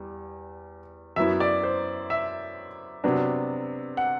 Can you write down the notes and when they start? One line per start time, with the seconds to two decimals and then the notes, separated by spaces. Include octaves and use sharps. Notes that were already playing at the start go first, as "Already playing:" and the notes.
Already playing: E2 G3
1.16 F#2 F#3 B3 E4 E5
1.40 D5
1.63 C5
2.10 E5
3.04 C3 F#3 B3 D4
3.97 F#5